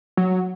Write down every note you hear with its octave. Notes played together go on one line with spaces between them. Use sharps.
F#3